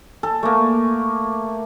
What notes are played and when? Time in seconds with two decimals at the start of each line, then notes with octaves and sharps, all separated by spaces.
0.23 A4
0.43 A3 A#3